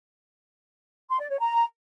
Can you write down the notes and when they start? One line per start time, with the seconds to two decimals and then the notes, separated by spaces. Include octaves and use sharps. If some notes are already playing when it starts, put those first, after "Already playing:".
1.10 C6
1.20 D5
1.30 C#5
1.40 A#5